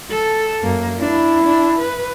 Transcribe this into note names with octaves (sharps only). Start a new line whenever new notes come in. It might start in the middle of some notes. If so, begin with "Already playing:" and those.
A4
F#2 A#3
D4 E4
D4
B4